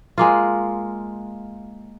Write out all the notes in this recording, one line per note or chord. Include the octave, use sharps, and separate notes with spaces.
G#3 A#3 F4